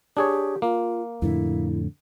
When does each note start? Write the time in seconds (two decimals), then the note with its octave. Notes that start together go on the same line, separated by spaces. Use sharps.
0.17 D4 G4 G#4 C#5
0.62 A#3 F4
1.22 F2 A2 D3 E4